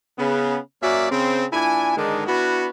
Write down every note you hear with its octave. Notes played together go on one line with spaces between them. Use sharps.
C#3 B3
F#2 A#3 C#4 F#4 D5 E5
C#3 C4
A#2 D4 E4 G#5
G#2 D3 D#3 G#3 D4 D#4
B3 D4 E4 F#4